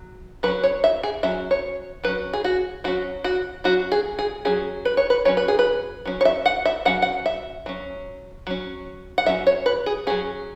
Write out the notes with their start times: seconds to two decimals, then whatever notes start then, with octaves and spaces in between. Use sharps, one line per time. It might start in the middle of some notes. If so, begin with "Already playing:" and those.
Already playing: F#3
0.43 F#3 B4
0.48 C#4
0.64 C#5
0.84 E5
1.03 G#4
1.23 F#3 C#4 E5
1.51 C#5
2.04 F#3 C#4 B4
2.33 G#4
2.44 F#4
2.84 F#3 C#4 F#4
3.24 F#4
3.64 F#3 C#4 F#4
3.92 G#4
4.19 G#4
4.45 F#3 C#4 G#4
4.85 B4
4.97 C#5
5.10 B4
5.25 F#3 C#4 C#5
5.37 B4
5.48 G#4
5.59 B4
6.06 F#3 C#4
6.21 C#5
6.25 E5
6.46 F#5
6.65 E5
6.85 F#3 C#4 F#5
7.02 F#5
7.26 E5
7.66 F#3 C#4
8.47 F#3 C#4
9.18 F#5
9.26 F#3 E5
9.29 C#4
9.47 C#5
9.66 B4
9.86 G#4
10.07 F#3 C#4 G#4